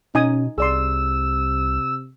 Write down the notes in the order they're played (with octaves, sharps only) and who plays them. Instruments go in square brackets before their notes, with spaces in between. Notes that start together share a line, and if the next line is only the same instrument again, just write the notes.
[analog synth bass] B2 [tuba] C#4 [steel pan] D#4 G#5 D#6
[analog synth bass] C2 [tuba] C3 [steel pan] G#4 D5 C6 [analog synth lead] E6